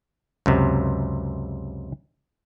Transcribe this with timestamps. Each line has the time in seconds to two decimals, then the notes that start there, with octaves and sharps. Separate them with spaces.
0.46 C#2 F#2 C3